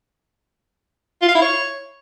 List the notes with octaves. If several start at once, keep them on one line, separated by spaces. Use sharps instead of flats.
F4
F5
E4
C#5